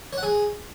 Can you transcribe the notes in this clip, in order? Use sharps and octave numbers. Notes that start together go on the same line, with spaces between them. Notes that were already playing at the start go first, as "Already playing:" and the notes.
C#5
F#5
G#4